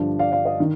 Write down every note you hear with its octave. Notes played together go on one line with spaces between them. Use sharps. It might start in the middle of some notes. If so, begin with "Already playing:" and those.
Already playing: G2 D3 F3
D5 F5
D5 F5
D#5
D#3